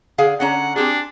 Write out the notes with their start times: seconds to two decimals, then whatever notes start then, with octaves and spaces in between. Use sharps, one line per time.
0.18 D3 G#4 F5
0.40 D3 C#4 F#5 A#5
0.76 C4 D4 G4 G#4